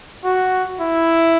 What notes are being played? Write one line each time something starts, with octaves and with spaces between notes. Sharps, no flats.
F#4
E4